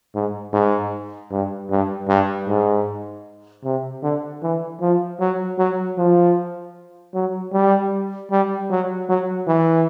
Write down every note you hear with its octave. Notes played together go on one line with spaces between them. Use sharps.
G#2
G#2
G2
G2
G2
G#2
C3
D3
E3
F3
F#3
F#3
F3
F#3
G3
G3
F#3
F#3
E3